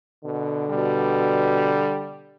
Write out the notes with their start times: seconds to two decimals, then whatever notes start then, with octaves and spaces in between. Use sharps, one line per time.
0.25 B2 D3
0.69 B2 G3